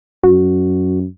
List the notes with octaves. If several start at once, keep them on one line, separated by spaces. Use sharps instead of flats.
F#2 F#4